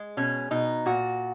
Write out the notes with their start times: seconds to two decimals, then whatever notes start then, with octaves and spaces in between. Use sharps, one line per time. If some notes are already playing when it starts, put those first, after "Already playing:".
Already playing: G#3
0.17 B2 C#4
0.51 B2 D#4
0.86 A#2 F#4